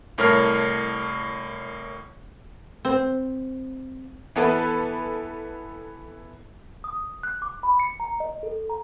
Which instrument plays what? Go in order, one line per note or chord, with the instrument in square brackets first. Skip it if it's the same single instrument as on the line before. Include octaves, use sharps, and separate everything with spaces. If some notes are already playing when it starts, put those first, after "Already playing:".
[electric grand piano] C2 A2 A#4 C#5 A5 F6
[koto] C4
[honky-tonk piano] E3 B3 A4 B4
[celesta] D#6
F#6
D6
B5
C#7
A#5
D#5
A4
A#5